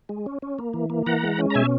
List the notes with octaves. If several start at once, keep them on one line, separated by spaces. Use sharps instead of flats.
G#3
C#4
C#4
A#3
E3
A#3
E3 F#5 A#5
G#3
C#4
A#5
B2 E5 G#5